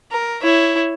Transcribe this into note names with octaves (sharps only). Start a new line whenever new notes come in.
A#4
E4 C#5